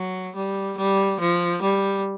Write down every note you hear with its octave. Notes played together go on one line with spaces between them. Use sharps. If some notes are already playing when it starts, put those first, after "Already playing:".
Already playing: F#3
G3
G3
F3
G3